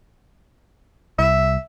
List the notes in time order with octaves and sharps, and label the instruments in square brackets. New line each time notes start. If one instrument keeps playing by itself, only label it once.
[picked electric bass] C2 [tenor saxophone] E5